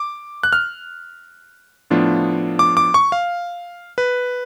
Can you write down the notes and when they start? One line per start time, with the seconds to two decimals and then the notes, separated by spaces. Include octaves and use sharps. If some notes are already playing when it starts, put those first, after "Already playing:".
Already playing: D6
0.43 F#6
0.53 F6
1.91 A2 F3 B3 D4 F4
2.59 D6
2.77 D6
2.94 C#6
3.12 F5
3.98 B4